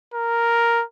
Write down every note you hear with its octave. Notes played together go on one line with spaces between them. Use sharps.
A#4